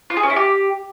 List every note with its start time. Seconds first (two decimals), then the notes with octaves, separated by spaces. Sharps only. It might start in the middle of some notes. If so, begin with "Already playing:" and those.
0.10 F4
0.17 G#4
0.23 C#4
0.30 E4
0.36 G4